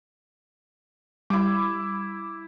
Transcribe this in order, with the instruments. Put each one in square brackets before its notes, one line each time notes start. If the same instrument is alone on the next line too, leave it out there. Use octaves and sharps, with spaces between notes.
[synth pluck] G3 [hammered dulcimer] E4 D6